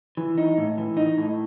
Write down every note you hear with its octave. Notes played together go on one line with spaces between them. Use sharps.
E3
D#4
A2
E3
D#4
A2